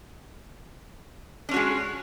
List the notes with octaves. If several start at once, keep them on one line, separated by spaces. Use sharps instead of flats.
G#3 C#4 D4 F#4